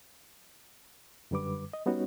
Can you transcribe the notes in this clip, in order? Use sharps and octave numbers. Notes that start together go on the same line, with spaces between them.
F#2 D3 G3 B4 D6
D#5
G3 B3 C#4 D#4 F#4 C#5